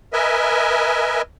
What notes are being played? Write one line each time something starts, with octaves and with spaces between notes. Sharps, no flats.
A#4 B4 D#5 E5 G#5